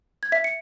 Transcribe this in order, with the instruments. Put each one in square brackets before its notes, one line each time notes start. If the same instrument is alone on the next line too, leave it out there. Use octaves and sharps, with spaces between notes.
[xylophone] G#6
E5 B6
C#7